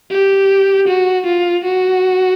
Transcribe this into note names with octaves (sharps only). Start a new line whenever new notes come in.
G4
F#4
F4
F#4